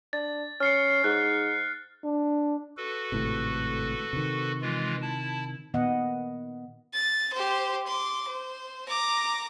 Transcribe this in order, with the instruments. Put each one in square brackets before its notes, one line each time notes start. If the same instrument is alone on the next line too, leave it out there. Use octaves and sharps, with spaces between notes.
[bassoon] D4 [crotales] A6
[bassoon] C#4 [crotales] F6 C7 C#7
[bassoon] G#2 [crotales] F#6
[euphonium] D4
[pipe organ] F#4 A4 B4
[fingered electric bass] G#1 A2 C3
C3 D#3
[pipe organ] E3 G#3 F4
E4 A5
[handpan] A#2 D#3 B3 D#5 F#5
[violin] A6
G4 C5
C6 D6
C5
A#5 D6